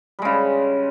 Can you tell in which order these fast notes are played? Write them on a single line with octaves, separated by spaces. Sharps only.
G3 G#3 C#3